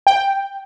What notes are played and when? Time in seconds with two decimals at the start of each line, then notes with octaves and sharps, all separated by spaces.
0.07 G5